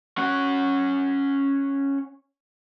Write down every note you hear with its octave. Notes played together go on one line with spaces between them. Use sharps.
C#4 F#5